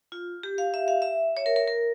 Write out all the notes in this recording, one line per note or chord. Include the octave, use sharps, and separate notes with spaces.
F4
G4
F5
E5
F5
E5
C#5
A#4
A#4
A#4